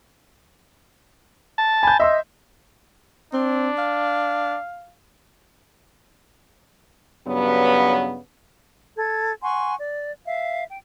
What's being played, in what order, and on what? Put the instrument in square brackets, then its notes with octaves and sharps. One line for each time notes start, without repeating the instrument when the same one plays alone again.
[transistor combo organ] A5
[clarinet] G#5 [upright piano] B5 G6
[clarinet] D#5 [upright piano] E5 C6 E6
[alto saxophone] C4 [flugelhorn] D4
[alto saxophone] F5
[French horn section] G2 C#3 F#3 B3
[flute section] A4 G#6
F#5 G#5 C6 C#6
D5
E5 F5
G5